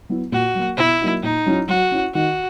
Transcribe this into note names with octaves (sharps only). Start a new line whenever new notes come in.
F#3 B3 E4
A#2 F#4
F#3 A#3
B2 E4
F#3 A#3 D#4 F#4
A#2 D#4
F#3 C#4 E4
F#3 F#4
C#4 E4
D#3 F#4